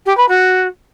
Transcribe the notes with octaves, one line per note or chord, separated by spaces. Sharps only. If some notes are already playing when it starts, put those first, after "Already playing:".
G4
B4
F#4